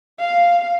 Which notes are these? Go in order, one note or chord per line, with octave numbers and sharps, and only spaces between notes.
F5